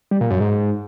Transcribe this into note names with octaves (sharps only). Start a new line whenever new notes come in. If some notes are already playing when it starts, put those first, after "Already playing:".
G3
A#2
F#2
G#2